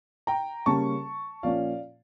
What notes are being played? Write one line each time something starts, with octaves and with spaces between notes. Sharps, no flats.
G5 A#5
C#3 G3 A#3 C#4 A5 C#6
A#2 F3 A#3 C#4 D5 F5